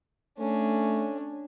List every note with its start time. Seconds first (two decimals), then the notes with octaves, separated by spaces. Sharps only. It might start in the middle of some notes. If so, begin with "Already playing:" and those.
0.39 A3 C#4 D4